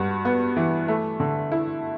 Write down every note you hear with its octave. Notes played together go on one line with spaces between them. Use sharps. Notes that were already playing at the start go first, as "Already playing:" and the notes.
Already playing: G2 F#4
B3
E3
A3
D3
E4